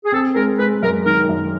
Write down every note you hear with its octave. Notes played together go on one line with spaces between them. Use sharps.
G#4
C4 A4
G#3 A#4
G#3 B4
F#2 A#4
D#3 A#4
F#2